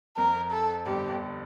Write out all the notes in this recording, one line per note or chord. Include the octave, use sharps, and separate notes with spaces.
F2 A#4
A4
G1 G2 G4
G1 G2